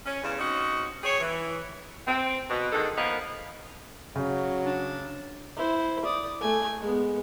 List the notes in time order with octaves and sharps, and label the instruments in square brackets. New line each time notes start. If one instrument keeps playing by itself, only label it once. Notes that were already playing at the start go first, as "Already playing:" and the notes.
[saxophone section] C#4
E2 G2 C#3
C4 C#4 D#4 F#4
G4 G#4 C#5
E3
C4
B2
D3 D#3 G#3 D#4 A4
D#3 F3 A#3 B3 D#4
[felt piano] C#3 [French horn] F#3
[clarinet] D4
[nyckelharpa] E4 C5
D5 D#6
A3 G#5
G#3 B3